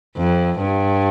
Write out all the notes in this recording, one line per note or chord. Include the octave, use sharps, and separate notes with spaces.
F2
G2